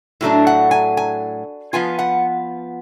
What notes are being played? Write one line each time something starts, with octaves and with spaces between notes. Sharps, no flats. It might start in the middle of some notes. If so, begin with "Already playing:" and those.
A2 F#3 A3 D4
F#5
G#5
G#5
F3 B3 F4 G#5
F#5